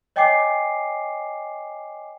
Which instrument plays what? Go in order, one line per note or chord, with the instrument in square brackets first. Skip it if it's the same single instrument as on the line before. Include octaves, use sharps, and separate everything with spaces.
[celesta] C#5 D#5 G5 G#5 D6 C7